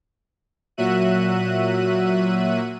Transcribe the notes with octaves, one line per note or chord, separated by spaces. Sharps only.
A#2 F#3 F#4 E5 F#6 D#7